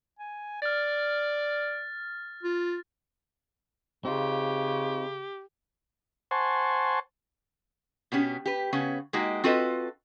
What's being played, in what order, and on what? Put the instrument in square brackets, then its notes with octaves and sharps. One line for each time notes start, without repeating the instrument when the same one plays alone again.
[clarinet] G#5
[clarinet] D5 [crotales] F6 A6
[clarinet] F4
[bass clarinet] C#3 [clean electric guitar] C4 D#4 F4 [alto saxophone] G4
[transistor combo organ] C5 F#5 G#5 A5 C6 C#6
[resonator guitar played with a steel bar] B2 B3 C#4 G4
G4 B4
C#3 B3 C#4 C#5
G#3 A#3 D#4 F#4 G4
C4 F4 F#4 A4 B4 D#5